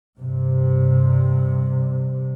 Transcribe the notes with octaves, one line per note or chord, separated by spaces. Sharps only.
G2 C3